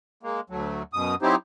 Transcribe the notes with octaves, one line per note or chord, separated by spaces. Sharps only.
G#3 A#3
D2 F#3 A3
F#2 B2 D#6
F#3 C4 D#4 E4 G4 C5